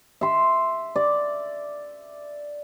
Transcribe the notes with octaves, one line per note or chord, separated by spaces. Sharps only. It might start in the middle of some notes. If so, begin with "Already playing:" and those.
E5 C6
D5